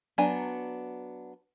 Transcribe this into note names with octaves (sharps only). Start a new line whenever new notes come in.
F#3 B3 D4 G#5 A#5